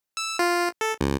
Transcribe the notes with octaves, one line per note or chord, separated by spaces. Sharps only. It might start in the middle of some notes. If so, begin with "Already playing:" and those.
E6
F4
A4
C#2